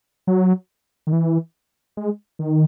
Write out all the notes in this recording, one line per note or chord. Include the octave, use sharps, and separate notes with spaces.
F#3
D#3
E3
G#3
D#3